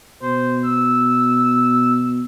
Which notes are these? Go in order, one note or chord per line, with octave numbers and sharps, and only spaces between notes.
B2 C5
E6